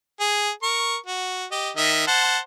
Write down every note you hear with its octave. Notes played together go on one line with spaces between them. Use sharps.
G#4
A#4 C#6
F#4
G4 D#5
D#3 D#5 E5
C5 F#5 A5